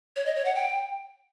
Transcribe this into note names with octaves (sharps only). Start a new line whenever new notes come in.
C#5
D#5
C#5
F#5
G5